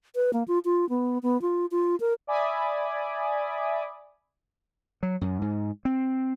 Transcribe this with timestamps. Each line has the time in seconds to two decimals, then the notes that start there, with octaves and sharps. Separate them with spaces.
0.15 B4
0.33 A#3
0.48 F4
0.65 F4
0.89 B3
1.23 B3
1.42 F4
1.71 F4
2.00 A#4
2.27 D5 E5 G#5 B5 D6 D#6
5.03 F#3
5.21 F#2
5.42 G#2
5.85 C4